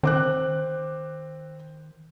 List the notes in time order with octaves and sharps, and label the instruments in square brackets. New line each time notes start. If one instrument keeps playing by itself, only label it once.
[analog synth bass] D#3 [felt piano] C4 D6 F#6